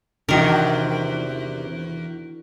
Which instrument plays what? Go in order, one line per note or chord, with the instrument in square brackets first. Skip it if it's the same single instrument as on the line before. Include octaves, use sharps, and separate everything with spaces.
[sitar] E2 [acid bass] C3 [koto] D#3 A#4 [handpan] D4 F#4